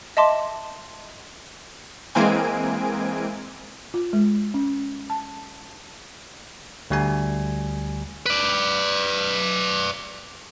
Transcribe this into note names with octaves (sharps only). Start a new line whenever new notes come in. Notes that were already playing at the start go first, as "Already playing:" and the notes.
D#5 E5 A5 C6 D6
E3 G#3 A#3 C4 G#5 D7
F4
G#3
C#4
A5
D2 G3 G#5
B4 D5